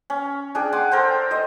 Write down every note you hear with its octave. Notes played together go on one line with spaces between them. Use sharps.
C#4
D4 G#4 G5
F#5 G#5 C6 D6
A4 A#4 C5 G5
C5 D#5